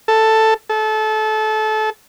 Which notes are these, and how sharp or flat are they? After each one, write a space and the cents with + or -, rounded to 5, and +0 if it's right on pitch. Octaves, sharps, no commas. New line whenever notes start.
A4 +5
A4 -25